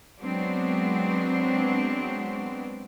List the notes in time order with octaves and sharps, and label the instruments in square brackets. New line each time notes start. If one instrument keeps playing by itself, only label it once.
[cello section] F#3 G#3 B3 C4 D4